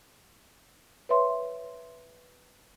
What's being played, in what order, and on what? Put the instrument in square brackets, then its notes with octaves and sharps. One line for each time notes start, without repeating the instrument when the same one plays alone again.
[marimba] B4 C#5 E5 C6